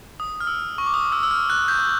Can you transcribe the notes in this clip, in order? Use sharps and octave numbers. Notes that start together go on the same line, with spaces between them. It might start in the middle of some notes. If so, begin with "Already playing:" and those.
D#6
F6
E6
C#6
D6
D#6
E6
E6
F6
F#6
G6